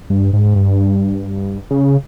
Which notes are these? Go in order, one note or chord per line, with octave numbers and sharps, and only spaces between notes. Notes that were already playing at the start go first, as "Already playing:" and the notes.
G2
G#2
G2
C#3